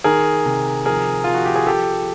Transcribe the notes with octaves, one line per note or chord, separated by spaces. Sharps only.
D#3 G#4 A#4
C3
F3 G#4 A#4
F3 F4
F#4
G4
G#4
F3 G4 A4